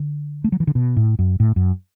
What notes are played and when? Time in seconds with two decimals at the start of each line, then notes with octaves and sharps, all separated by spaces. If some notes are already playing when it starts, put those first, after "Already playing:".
Already playing: D3
0.44 A3
0.52 F#3
0.60 E3
0.67 D3
0.75 B2
0.97 A2
1.19 F#2
1.40 A2
1.56 F#2